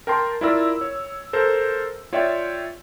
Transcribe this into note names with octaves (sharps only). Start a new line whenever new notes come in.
A#4 G5 A5 C6
E4 F4 A#4 D5 B5 E6
C#5
A4 A#4 C5
F4 C#5 D5 E5 G5